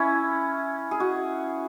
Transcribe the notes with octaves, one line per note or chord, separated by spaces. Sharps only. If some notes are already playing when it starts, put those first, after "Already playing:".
Already playing: C#4 E4
G#4
F#4